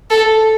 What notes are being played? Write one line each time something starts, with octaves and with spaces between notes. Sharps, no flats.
A4